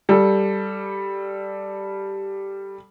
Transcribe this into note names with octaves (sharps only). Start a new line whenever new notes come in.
G3 A4